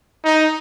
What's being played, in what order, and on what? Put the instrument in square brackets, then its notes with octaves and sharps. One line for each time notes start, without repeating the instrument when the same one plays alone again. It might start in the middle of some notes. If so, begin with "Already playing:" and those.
[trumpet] D#4